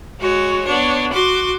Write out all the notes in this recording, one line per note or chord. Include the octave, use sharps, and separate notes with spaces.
G#3 F#4 C#5
B3 D4 C#5
F#4 C6 D6